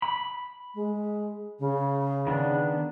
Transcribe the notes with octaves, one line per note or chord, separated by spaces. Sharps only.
B5
G#3
C#3
D#3 B3 D4